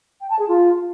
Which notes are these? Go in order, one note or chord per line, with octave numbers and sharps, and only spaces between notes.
G5
A5
G#4
F4